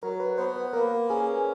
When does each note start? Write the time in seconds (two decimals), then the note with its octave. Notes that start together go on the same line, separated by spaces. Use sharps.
0.03 F#3 A#4
0.20 B4
0.38 B3 C5
0.56 B4
0.73 A#3 A#4
1.09 C#4 G#4